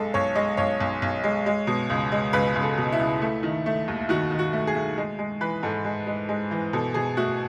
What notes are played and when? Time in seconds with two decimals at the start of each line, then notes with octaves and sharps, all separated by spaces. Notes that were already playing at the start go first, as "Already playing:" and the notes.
Already playing: B1 G#3 A4
0.14 B1 C#5
0.35 G#3 D#5
0.57 B1 C#5
0.80 B1
1.02 B1
1.24 G#3
1.46 G#3
1.67 B2
1.90 C#2
2.12 G#3
2.33 C#2 B4
2.56 C#2
2.63 A4
2.77 B2
2.92 E4
2.99 C#2
3.22 A3
3.43 D#3
3.66 A3
3.88 D#2
4.09 D#3 F#4
4.31 D#3
4.39 F#4
4.53 A3
4.67 G#4
4.75 A3
4.97 G#3
5.19 G#3
5.41 E3 B4
5.63 G#2 A4
5.85 G#3
6.07 G#3
6.29 G#3
6.51 E3
6.73 B2 A4
6.94 B2 G#4
7.17 A3 F#4